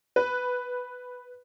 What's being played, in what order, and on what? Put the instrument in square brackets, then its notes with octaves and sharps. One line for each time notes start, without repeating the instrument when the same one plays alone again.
[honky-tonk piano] B4